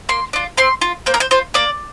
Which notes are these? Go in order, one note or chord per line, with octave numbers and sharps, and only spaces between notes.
A#3 C6
D4 F4
C4 C6
F4
A#3 C5
A#4
C5
F4 C5
A#3 D5